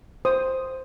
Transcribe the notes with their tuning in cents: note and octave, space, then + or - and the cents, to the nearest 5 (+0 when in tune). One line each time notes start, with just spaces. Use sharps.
C5 +0 D#6 +0